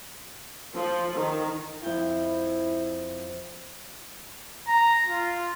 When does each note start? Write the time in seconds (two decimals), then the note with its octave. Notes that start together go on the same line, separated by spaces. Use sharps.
0.76 F3
1.17 D#3
1.84 F2 E4 G5
4.68 A#5
5.07 F4